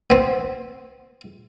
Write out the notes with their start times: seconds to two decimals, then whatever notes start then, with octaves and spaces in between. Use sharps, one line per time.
0.10 B3 C4